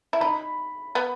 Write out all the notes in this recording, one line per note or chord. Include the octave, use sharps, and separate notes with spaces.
E4
D#4 B5
B3